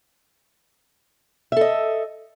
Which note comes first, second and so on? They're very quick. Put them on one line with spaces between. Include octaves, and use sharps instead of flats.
E5 A4 D#5